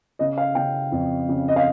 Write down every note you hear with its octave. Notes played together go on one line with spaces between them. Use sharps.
C#3 D#5
F5
C#3 G5
F2
C#3
D#5
F5